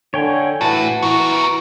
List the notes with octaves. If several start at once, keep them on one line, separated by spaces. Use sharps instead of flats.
D3 C#5 G5 G#5
A2 E3 F#4 A5
E3 B3 A#4 C#6